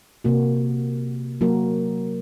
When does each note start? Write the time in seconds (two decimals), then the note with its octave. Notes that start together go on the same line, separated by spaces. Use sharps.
0.24 C3 A#3 F#4
1.41 F#3 A#3 F#4 A#4